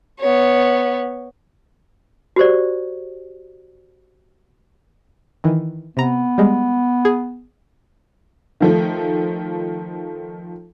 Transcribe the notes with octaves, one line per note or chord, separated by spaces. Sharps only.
B3 C#5
F#4 G4 C5 D5
D#3 E3
C3 B3 A#5
G3 G#3
G#4
D#3 F3 A3